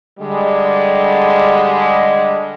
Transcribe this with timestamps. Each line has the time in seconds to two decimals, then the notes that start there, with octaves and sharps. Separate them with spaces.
0.19 D3 G3 G#3